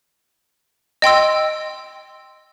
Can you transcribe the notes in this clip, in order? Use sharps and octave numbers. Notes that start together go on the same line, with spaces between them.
D#5 G5 C6 E6